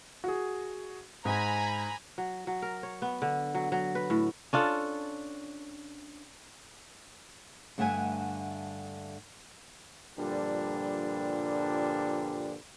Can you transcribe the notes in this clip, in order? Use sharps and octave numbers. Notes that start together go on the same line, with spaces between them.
F#4 G#4
G#2 G#5 A#5 B5
F#3
F#3
A#4
C#5
B3
D3
F#3
F#3
B4
A2
C#4 D4 F4 A4
G2 D3 A3 E5 F#5 G#5
G2 A#2 D3 F3 G3 D4